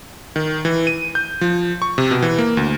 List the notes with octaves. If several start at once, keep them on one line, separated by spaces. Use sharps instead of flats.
D#3
E3
D#7
G6
F3
C#6
C3
B2
E3
A#3
D2